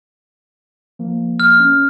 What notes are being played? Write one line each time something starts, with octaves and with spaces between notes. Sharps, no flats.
F3 A#3
F6
C#4